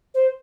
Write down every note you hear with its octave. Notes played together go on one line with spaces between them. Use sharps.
C5